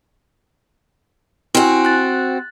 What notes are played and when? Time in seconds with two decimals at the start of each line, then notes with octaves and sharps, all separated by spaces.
1.55 C4 E4 F#4 G#5
1.85 F#6 A6